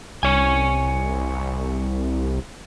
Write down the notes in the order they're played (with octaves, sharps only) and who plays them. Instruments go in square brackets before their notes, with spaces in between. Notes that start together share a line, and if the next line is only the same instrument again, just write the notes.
[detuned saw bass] C2 [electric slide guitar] C#5 G#5